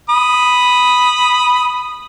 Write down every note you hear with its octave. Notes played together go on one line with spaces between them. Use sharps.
B5 D#6